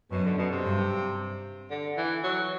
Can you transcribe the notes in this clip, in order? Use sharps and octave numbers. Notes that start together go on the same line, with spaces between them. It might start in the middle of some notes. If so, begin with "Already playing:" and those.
F#2 B2
D3
B2
C3
G2
D3
E3
F#3